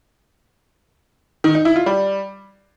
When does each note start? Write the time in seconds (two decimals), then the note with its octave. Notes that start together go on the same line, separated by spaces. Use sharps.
1.44 D#3
1.55 D#4
1.65 E4
1.76 F4
1.86 G3